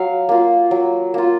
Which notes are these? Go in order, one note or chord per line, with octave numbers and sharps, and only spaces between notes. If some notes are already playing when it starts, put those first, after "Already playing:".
Already playing: F#3 F5
A#3 F4
F#3
A#3 F4